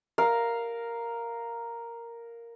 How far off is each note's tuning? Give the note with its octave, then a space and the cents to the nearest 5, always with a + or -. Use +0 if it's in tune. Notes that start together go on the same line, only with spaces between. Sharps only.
A#4 +0 F5 +0